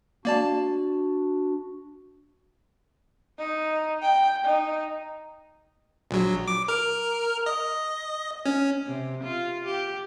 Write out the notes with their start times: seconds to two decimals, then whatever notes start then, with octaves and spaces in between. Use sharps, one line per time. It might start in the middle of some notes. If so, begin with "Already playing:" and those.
0.25 A#3 D4 F#4 D5 A5
3.39 D#4
4.02 G5
4.44 D#4
6.11 A#1 F#3
6.48 D6
6.68 A#4 F6
7.46 D#5
8.46 C#4
8.86 C3
9.23 F4
9.66 G4